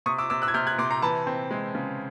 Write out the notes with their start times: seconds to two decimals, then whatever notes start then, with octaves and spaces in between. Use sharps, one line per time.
0.06 C3 C#6 D#6
0.18 D6 E6
0.30 C3 D6 E6
0.42 E6 F#6
0.48 G#6
0.54 C3 F6 G6
0.67 F#6 G#6
0.78 C3 C6 D6
0.90 A#5 C6
1.02 E3 A5 B5
1.27 C4
1.51 G#3
1.75 C#3